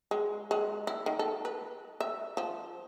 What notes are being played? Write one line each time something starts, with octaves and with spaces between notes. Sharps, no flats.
G#3
G#3
E4
D#3
A4
B4
E5
F3